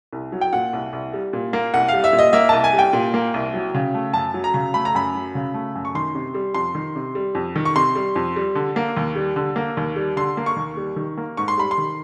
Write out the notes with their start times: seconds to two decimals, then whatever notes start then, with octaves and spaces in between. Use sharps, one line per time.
0.13 C2
0.32 F#3
0.41 G5
0.53 A#2 F#5
0.73 C2
0.93 C2
1.13 G3
1.33 A#2
1.53 A#3
1.74 C2 F#5
1.88 G3 F5
2.04 E5
2.13 A#2
2.19 D#5
2.33 A#3 E5
2.49 C2 A5
2.64 G#5
2.73 G3
2.79 G5
2.93 A#2
3.14 A#3
3.34 C2
3.54 F#3
3.75 C#3
3.94 A3
4.14 F#2 A5
4.34 F#3
4.44 A#5
4.54 C#3
4.74 A3 B5
4.85 A#5
4.95 F#2 B5
5.15 F#3
5.35 C#3
5.54 A3
5.75 F#2
5.85 C#6
5.95 D#3 C6
6.15 C3
6.34 G3
6.54 F2 C6
6.75 D#3
6.96 C3
7.15 G3
7.35 F2
7.56 D#3
7.65 C#6
7.76 C3 C6
7.95 G3
8.16 F2
8.36 G3
8.55 D3
8.76 A#3
8.97 D#2
9.16 G3
9.36 D3
9.56 A#3
9.77 D#2
9.96 G3
10.17 D3 C6
10.37 A#3
10.46 C#6
10.56 D#2
10.77 G3
10.96 D#3
11.18 A#3
11.37 G#2 C#6
11.48 C6
11.57 G3 B5
11.71 C6
11.78 D#3